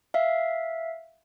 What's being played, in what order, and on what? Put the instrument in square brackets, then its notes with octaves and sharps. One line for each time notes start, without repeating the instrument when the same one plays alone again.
[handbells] E5 F5